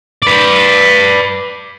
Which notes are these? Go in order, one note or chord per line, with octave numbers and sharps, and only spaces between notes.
B4 D5